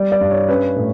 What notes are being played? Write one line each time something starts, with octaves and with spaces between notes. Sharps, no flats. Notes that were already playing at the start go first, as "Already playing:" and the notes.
Already playing: G3 D5
D5
G2
C#5
C#4 B4
A2